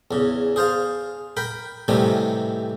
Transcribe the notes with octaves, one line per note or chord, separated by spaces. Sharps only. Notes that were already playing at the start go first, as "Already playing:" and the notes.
E2 C#3
G#4 C5 F5 A5
A#4 G5 B5
A2 C3 D#3 E3 G3 A3